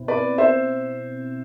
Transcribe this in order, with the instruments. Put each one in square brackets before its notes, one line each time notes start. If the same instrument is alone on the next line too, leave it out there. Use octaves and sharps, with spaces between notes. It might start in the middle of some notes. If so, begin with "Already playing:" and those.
Already playing: [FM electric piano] B2 C4 E4
[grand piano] B4 D5
C5 E5